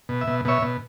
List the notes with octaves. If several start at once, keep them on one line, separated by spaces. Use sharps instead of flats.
B2
E5
B2
B2 C#5 E5
B2